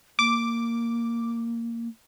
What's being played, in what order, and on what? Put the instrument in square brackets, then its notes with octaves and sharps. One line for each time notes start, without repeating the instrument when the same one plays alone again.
[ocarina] A#3 [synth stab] D6